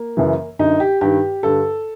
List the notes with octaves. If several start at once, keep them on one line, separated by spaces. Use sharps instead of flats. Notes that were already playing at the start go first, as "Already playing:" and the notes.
Already playing: A#3
F#2 C#3 E3
F#2 D3 D#4
G4
G2 D#3 G4
G2 D3 A4